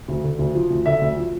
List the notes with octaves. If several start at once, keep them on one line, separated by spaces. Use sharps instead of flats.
D2
D3
D2
F3
D2
D3 E5
D2
F3